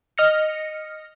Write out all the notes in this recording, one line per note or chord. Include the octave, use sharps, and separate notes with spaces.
D#5 F6 A#6 C#7